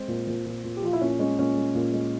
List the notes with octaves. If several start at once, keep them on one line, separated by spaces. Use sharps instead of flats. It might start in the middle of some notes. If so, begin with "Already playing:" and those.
Already playing: G#3 C4
A#2
A#2
A#2
A#2
G4
F3 F4
E4
A#2 C#4
G#3 C#4
A#2 C#4
G#3
A#2
G#3